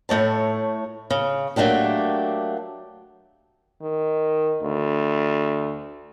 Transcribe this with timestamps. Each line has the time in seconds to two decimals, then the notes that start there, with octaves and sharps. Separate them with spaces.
0.09 A2 A3 C#5 A5
1.10 C#3
1.56 F#3 A3 A#3 D4 G4
3.82 D#3
4.63 D2